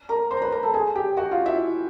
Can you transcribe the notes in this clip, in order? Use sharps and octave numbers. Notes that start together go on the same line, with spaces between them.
A#4 A#5
C5 C6
A#5
B4 B5
A#4 A#5
A4 A5
G#4 G#5
G4 G5
F#4 F#5
F4 F5
E4 E5